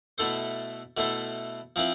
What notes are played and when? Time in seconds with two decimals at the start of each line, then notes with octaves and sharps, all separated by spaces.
0.18 B2 A3 E4 A4 C5
0.97 B2 A3 E4 A4 C5
1.76 F3 C4 E4 B4